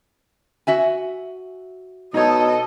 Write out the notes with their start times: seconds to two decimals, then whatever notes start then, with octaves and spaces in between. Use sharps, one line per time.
0.67 F#4 E5 G#5
2.14 B2 D#4 A4 C#5 D#5